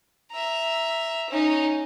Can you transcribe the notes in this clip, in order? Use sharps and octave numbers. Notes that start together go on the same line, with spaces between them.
E5 A#5
C#4 D#4